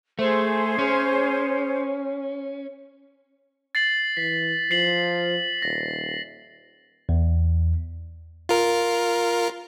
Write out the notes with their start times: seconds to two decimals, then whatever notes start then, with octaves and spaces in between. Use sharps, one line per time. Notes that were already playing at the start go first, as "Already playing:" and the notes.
0.19 A3 G#4 C5
0.79 C#4
3.75 A6 C7 F#7
4.17 E3 B6
4.71 F3 C7 F#7
5.62 D#1 A#6
7.09 E2
8.49 F4 A#4